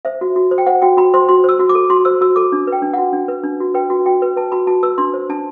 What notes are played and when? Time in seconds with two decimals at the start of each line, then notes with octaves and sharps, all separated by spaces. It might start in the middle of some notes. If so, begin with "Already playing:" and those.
0.05 C5 E5
0.21 F#4
0.36 F#4
0.51 C5
0.58 G5
0.67 C5 F#5
0.82 F#4 G5
0.97 F#4 B5
1.14 C5 C6
1.29 F#4 C6
1.44 C5 E6
1.59 F#4
1.69 D6
1.75 A4
1.90 F#4 C6
2.05 C5 E6
2.21 F#4 E6
2.36 A4 D6
2.52 D4
2.67 B4
2.72 G5
2.82 D4
2.94 F#4 F#5
3.13 D4
3.28 B4
3.44 D4
3.60 F#4
3.75 B4 G5
3.90 F#4
4.06 F#4 G5
4.22 B4
4.36 B4 A5
4.52 F#4 B5
4.67 F#4 A5
4.83 B4 E6
4.98 D4 C6
5.14 C5
5.29 D4 A5